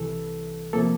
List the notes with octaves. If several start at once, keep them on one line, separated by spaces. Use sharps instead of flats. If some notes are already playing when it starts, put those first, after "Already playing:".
Already playing: C2 C3 E3 A4
C3 F3 A#3 A4